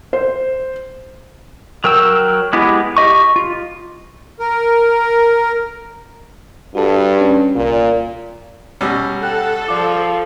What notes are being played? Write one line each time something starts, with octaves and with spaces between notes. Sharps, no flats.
C5
F#3 A#4 G5 E6
G#3 B3 E4 G4
G4 D#5 C#6
F4
A#4
G2 F#4 A4
C#4
C2 A#2
B2 G3 C#4 A#5 E6
A4 F#5 G5 F#6
F3 D5 F5 D6